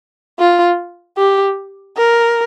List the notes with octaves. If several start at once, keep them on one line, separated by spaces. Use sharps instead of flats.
F4
G4
A#4